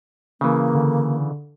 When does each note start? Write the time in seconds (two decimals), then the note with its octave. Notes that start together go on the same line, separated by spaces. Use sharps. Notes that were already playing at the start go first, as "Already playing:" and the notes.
0.41 C#3 E3 A#3
0.75 D3